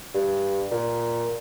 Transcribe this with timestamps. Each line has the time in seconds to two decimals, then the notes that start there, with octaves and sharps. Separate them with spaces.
0.14 G2
0.71 A#2